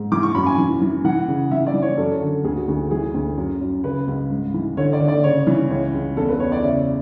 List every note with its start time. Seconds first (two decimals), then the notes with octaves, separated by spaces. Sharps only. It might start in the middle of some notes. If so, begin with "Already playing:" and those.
Already playing: G#2
0.12 E3 D6
0.23 C#6
0.35 F#2 B5
0.47 G#5
0.58 E3
0.82 E3
1.05 E3 F#5
1.28 C#3
1.51 E3 E5
1.67 D5
1.74 E3
1.82 C#5
1.97 F#2 A4
2.21 D3
2.44 D2 G#4
2.56 F#4
2.68 D2 G#4
2.79 F#4
2.91 E3 G#4
3.14 D2
3.37 F#2
3.61 F#2
3.84 C#3 B4
4.07 C#2
4.30 G#2
4.54 E3
4.77 D3 C#5
4.93 D5
5.00 D3
5.08 D5
5.24 C#3 C#5
5.47 E3
5.70 C#2 C#5
5.94 C#2
6.17 E2 A4
6.29 B4
6.40 E2 C#5
6.52 D5
6.64 C#3 E5